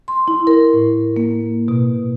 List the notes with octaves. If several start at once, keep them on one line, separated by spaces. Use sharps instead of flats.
C6
E4
A#4
A2
A#3
B2